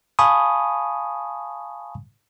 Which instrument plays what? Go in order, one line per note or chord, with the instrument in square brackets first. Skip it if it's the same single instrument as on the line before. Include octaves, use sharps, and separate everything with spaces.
[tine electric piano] F5 G#5 A5 B5 C#6 D#6